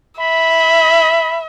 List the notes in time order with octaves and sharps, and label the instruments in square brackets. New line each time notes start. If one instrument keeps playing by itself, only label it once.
[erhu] E5 [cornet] B5